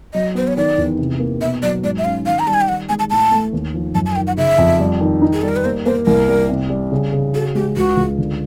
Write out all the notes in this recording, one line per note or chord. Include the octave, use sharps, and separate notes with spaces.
F#3 D#5
B3 C5
C#5
D#3 D5
E2
C3
A#3
B2 E5
F#3 D5
G#2 D5
E5
C#4 F5
D#3 F5
A#5
G3 A5
G#5
G5
D#3 F#5
G#3 G#5
A5
A2 A5
A3
D#2
F3
F#2 A5
A5
G#5
D#3 G5
F#5
C#3 E5
F2
G3
D#3
D#4
G#4
G3 A4
A#4
B4
A#3 C5
A#3 C5
C2 A#4
G3
C3
G3
C#3
C#3
F#4 A4
G#3 G4
C#2 F#4
C#2
D3